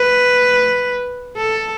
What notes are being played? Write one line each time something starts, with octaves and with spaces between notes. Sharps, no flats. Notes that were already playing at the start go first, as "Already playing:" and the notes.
Already playing: B4
A4